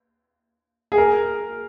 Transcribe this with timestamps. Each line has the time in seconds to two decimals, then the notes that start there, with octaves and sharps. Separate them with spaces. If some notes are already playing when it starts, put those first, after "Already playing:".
0.92 G#4
0.98 A#4